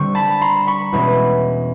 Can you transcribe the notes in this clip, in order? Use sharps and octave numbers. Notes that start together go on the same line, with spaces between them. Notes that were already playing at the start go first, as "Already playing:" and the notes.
Already playing: D3 G3 C4 C#6
A5 B5
A#5 C6
B5 C#6
E2 B2 G#3 C#4